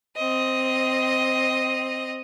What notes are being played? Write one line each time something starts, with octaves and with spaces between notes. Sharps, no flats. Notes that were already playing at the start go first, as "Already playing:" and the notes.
C4 D#5